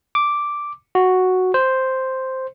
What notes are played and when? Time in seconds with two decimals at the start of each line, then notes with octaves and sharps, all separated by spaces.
0.15 D6
0.95 F#4
1.54 C5